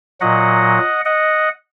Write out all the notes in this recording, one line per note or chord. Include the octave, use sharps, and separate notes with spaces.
A#2 F#3 D#5 F#5
D#5 F#5